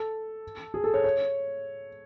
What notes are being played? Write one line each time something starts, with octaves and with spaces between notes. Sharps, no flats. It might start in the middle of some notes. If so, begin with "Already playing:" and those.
Already playing: A4
G#4
A4
C#5
C#5